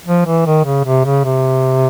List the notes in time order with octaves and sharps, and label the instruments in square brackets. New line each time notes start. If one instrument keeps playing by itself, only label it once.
[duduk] F3
E3
D#3
C#3
C3
C#3
C3